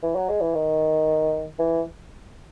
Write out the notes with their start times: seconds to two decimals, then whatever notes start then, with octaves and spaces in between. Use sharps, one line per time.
0.03 E3
0.15 F#3
0.29 G#3
0.41 E3
0.54 D#3
1.59 E3